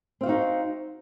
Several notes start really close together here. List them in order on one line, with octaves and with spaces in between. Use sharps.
C4 F5 F#4 D#4